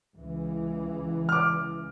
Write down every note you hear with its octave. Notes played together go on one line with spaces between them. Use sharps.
C#2 E3
D6 F6